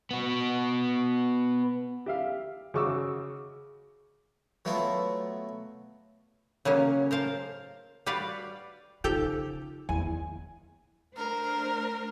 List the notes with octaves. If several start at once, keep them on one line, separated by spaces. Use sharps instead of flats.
B3 F#4
G4 E5 F5
C#3 F#4 C#6 D6 E6
F#3 A3 B3 E4 F4
C#3 F#3 A#3 C#4
A#4 C5 F5 A5
G3 F#4 B4 D5 F5 F#5
C#3 F3 D#4 G4 A4 G5 F7
E2 D3 G#5
A3 D4 A#4 C5